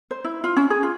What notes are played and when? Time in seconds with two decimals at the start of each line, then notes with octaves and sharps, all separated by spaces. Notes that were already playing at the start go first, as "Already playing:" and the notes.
0.11 C5
0.24 E4
0.44 F4
0.56 C#4
0.70 G#4
0.83 F4